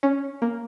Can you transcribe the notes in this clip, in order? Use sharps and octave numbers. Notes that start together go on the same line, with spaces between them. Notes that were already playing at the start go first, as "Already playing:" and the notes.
C#4
A#3